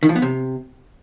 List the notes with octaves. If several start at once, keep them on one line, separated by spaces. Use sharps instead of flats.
D#3
F3
B3
C3